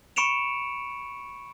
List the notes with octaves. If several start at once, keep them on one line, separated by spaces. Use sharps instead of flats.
B5 C#6 C#7 D7 E7 F7